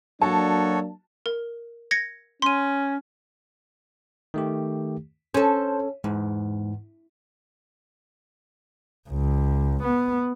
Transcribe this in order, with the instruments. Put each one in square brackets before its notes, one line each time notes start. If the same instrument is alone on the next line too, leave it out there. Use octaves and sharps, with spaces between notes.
[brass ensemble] F#3 A#3 D4 [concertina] F#4 A4 C#5 [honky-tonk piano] A5
[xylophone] A#4
G#6 A#6 C#7
[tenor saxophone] C#4 [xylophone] C6 D#7
[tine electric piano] D#3 A3 G4
[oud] C#4 A4 [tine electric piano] C5
[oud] E2 [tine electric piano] G#2
[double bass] C#2
B3